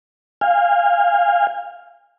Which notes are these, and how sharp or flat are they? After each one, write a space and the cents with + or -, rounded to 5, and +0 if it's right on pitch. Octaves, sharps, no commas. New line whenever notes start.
F5 +0 G#5 -35